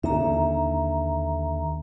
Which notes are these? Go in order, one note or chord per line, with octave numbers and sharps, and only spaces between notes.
D#2 D3 E5 A#5